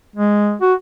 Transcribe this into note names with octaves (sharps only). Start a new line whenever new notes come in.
G#3
F#4